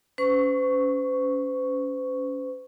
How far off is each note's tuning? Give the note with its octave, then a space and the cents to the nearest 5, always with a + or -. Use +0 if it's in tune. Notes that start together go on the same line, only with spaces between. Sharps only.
C#4 +20 C5 -45 C#6 +0